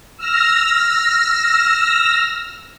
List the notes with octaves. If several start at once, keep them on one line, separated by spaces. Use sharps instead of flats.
E6 F6 A#6